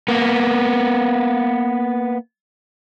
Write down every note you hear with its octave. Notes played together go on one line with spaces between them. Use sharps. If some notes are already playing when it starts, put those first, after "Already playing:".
A#3 B3